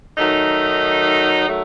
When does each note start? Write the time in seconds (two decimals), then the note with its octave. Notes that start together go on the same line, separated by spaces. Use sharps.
0.17 D#3 F#3 A3 D#4
1.47 D#3 F#3 A3